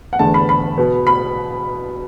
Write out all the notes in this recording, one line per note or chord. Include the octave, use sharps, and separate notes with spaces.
F#5
E2 D3 A3 A5
B5
B5
B2 B3
B5